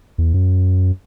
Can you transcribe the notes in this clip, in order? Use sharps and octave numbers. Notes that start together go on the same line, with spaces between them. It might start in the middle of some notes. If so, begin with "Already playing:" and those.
E2
F#2